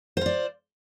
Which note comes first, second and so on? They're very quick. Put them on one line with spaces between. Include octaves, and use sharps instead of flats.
C5 F4 D5